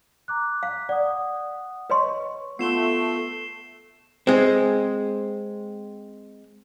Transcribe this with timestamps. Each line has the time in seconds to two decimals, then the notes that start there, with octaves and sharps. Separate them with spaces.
0.28 A#5 D6 F#6
0.63 F5
0.89 D5 F#5 D#6
1.90 B4 C#5 D#5 C6 C#6
2.59 A3 B3 F4 C7 E7 G7
4.27 G#3 C4